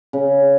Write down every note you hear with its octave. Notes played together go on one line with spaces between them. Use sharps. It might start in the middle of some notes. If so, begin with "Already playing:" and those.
C#3